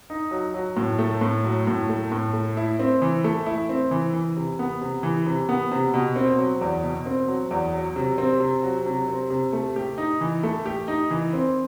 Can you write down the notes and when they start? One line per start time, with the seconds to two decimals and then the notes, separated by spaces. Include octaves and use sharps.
0.10 D#4
0.31 F#3
0.54 F#3
0.77 A2
0.99 A3
1.21 A2
1.44 F#3
1.67 A2
1.89 A3
2.12 A2
2.33 A3
2.57 E4
2.79 C4
3.02 E3
3.24 A3
3.46 E4
3.69 C4
3.91 E3
4.13 E3
4.37 C3
4.59 B3
4.81 C3
5.03 E3
5.26 C3
5.49 B3
5.72 C3
5.94 B2
6.16 C4
6.38 F#3
6.61 E2
6.83 B2
7.06 C4
7.29 F#3
7.51 E2
7.74 F#3
7.96 C3
8.18 C4
8.40 C3
8.63 F#3
8.86 C3
9.08 C4
9.30 C3
9.53 A3
9.76 G4
9.98 D#4
10.21 E3
10.43 A3
10.66 G4
10.88 D#4
11.11 E3
11.33 C4